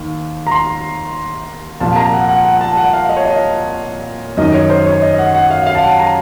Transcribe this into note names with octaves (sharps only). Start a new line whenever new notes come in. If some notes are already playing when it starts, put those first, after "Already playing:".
Already playing: D#2 D#3
A#5
C6
C2 A#2 F3 A5
A#5
F#5
F#5
F#5
A5
F#5
F5
D#5
C#5
D#5
F#2 D#3 D#5
C#5
C5
C#5
D#5
F#5
F#5
F5
F5
A5
F#5
A#5